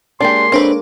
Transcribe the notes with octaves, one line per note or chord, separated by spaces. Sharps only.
G#3 A#3 C#4 D4 G4 C6
C4 D4 A4 B4 C#5